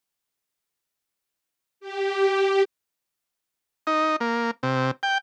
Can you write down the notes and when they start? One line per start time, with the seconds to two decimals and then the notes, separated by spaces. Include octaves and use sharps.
1.80 G4
3.87 D#4
4.20 A#3
4.63 C3
5.03 G5